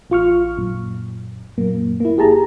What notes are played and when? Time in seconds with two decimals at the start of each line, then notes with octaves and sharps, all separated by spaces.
0.10 A1 F4 C#6 F6
0.58 F#2 A#2
1.58 F#2 A#2 A#3
2.00 A#3 E4
2.17 G1 G4 G#4 A5 A#5